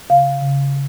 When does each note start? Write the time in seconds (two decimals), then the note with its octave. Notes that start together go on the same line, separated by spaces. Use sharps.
0.09 C#3 F5
0.41 C#3